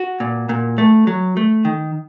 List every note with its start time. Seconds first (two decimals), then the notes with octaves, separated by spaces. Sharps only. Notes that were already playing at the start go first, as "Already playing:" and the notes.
Already playing: F#4
0.20 A#2
0.49 A#2
0.78 A3
1.07 F#3
1.37 A3
1.65 D#3